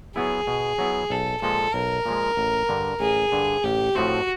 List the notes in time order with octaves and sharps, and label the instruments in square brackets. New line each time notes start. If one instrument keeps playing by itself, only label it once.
[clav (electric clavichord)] F#3 B3 E4 [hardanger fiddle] G#4
[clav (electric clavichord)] B2
F#3 B3 E4
[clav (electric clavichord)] B1 [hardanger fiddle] A4
[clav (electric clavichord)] A#2 F3 G#3 [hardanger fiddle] A4
[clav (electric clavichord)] B1 [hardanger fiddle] A#4
[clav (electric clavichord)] A#2 F3 G#3
A1
G2 D3
[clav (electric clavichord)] A1 [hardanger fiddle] G#4
[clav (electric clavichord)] G2 D3
[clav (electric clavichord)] A1 [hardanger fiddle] G4
[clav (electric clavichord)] A2 F3 A3 C4 [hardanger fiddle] F#4